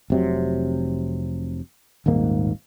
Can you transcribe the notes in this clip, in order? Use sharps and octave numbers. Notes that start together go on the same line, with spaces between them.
F1 C3 F#3
D#1 G#1 G#2 A#3